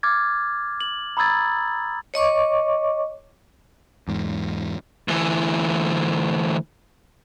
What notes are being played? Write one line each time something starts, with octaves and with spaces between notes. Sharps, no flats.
D6 F6 G#6 A6
F#7
A#5 B5 D#6 E6 G#6 A6
C#5 D#5 C#6 D6
E2 G#2
D2 E3